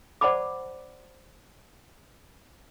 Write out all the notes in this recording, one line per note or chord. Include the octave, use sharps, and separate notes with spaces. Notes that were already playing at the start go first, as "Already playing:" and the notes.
C5 D5 F#5 A5 B5 D6